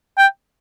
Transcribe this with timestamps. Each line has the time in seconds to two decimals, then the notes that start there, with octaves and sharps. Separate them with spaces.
0.18 G5